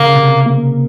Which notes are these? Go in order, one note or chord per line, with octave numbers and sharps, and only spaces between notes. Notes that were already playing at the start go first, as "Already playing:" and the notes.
Already playing: C#3 A#3
C3
A#3